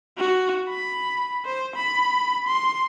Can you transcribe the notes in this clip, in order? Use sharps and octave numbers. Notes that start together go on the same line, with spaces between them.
F#4
B5
C5
B5
C6